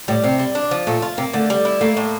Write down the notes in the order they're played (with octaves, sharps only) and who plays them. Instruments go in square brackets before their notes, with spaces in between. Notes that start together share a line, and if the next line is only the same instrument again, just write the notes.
[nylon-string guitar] A2 [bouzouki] G3
[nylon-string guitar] C3 [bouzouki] C4
[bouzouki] G3
D4
F3
[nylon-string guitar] A#2 [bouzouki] A3
[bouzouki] F4
[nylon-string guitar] C3 [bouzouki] A#3
[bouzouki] D3 [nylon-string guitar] A3
[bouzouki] G3
E4
[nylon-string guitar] A3 [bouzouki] A#3
[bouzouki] A2